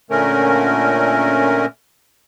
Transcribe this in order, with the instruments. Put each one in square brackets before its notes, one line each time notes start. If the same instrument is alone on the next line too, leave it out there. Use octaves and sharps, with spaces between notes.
[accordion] A#2 D3 A3 C#4 A#4